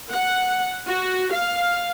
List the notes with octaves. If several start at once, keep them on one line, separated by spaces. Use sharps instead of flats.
F#5
F#4
F5